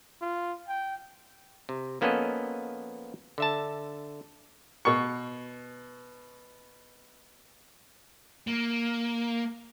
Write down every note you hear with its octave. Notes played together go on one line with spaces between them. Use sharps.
F4
G5
C3
F3 A#3 B3 C#4 A4 D#5
D3 E5 A5
B2 C#6
A#3